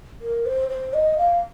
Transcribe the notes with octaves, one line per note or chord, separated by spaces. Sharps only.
A#4
C5
C5
D#5
F5